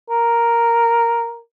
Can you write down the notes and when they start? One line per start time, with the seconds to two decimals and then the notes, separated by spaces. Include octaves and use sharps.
0.10 A#4